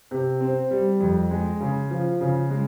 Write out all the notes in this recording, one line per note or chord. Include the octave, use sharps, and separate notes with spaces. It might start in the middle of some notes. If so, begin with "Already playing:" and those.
C3
C4
G3
F2
G#3
C#3
F3
C#3
G#3